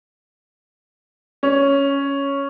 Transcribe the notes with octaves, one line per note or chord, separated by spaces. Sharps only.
C#4